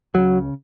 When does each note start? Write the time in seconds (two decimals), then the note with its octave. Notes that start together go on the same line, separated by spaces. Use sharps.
0.14 C#2 C#3 F#3